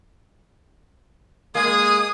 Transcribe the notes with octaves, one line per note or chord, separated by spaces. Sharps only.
G#3 A#3 G#4 D#6